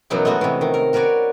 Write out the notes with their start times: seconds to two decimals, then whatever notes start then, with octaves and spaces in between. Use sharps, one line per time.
0.10 F#2 B2 E3 F#3 D#4 F#4
0.25 G#3 A3 B3 F#4
0.41 C3 E3
0.61 D#3
0.74 A#4
0.93 F#4 A#4 B4 C#5 D5